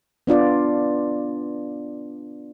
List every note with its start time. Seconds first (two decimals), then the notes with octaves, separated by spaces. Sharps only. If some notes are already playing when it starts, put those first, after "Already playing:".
0.27 B3 D4 F4 D5